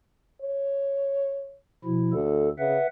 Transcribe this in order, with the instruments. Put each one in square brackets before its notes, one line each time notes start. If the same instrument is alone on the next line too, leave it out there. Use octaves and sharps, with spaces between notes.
[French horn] C#5
[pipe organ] B2 F3 E4
[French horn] D2 [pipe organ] A4
[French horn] C#3 [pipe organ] B4 E5 F#5